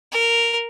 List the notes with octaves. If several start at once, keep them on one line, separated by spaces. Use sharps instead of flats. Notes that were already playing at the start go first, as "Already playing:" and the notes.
A#4